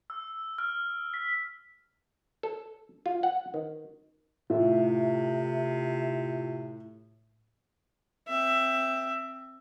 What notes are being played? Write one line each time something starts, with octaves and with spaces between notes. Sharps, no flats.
E6
F6
B6
A4
F4
F#5
D#3
A2 C3 F4 E5
C4 E5